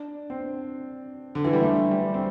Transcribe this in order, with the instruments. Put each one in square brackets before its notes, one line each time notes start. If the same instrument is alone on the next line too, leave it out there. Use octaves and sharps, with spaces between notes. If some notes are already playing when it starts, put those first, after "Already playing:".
Already playing: [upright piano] D4
C4
D3
E3
G3
A3
G3
C4